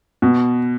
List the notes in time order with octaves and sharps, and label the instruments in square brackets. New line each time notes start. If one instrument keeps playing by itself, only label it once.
[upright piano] B2